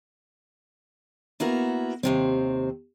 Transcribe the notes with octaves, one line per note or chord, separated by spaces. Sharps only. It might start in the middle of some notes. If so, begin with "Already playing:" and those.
A#3 B3 E4 F#4 A#4
D#2 C3 C4